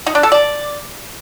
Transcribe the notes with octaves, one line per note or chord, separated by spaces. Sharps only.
D#4
D4
A4
D5